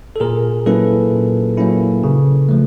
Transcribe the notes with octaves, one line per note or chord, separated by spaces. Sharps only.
A4
A#2 G#4 A#4
F#3 A#3 C#4 E4 A4 B4
A#2
F#3 A#3 C#4 E4
C#3
F3 A3